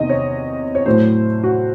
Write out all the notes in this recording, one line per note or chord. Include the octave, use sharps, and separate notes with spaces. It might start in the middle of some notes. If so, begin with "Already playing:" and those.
Already playing: E2 C3 D#3 D#5
C#5
C#5
A2 F#3 A3 C5
F#4